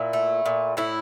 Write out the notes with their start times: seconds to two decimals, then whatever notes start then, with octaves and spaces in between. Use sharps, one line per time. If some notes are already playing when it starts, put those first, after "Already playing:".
Already playing: A#2 E4
0.13 A3
0.46 A#2
0.77 A2 E4